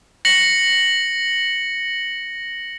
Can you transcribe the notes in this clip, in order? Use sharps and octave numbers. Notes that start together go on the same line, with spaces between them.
A#6 C#7 F#7